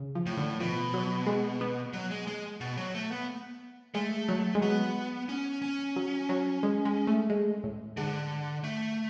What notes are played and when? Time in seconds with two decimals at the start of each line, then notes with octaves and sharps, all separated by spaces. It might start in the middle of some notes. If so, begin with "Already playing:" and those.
Already playing: C#3
0.15 F3
0.26 A2
0.37 D3
0.60 B2 F3
0.94 F#3
1.26 G#3
1.61 B3
1.93 F#3
2.11 G#3
2.27 G#3
2.61 B2
2.77 F#3
2.95 A3
3.11 B3
3.94 G#3 A3
4.28 F#3
4.55 G#3
4.61 F#3 B3
5.29 C#4
5.62 C#4
5.96 F#3
6.29 F#3
6.63 G#3
6.85 G#3
7.07 A3
7.30 G#3
7.64 A2
7.97 G#2 D3
8.64 A3